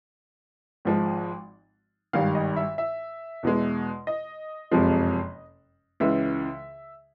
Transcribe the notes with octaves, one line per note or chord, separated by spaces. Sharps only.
G#1 G#2 F3 G#3
G#1 G2 D#3 F5
D#5
E5
E5
E2 B2 G#3
D#5
F#1 F2 C3 F3 G#3
C#2 C#3 E3 G#3 E5